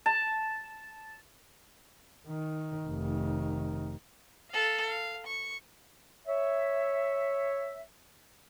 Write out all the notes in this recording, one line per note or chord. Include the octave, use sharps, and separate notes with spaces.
A5
D#3
F1 D#3
A4 F5
F5
C#6
C#5 E5